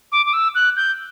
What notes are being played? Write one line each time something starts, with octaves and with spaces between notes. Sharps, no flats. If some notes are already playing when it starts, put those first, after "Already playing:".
D6
D6
E6
F#6
G6